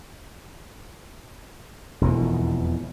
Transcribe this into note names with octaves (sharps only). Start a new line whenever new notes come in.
E1 F2 B2 E3